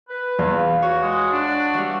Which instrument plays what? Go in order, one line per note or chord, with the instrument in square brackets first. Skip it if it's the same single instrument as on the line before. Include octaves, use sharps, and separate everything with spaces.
[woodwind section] B4
[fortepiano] E2 [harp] F4
[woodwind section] F#4 [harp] C#5
[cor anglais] G#3
[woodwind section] D4 [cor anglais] F#4
[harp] E3 G3